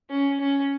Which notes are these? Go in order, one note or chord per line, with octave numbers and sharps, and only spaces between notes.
C#4
C#4